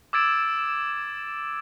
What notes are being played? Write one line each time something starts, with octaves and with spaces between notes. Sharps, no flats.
D6 E6 G#6 A6 D7 E7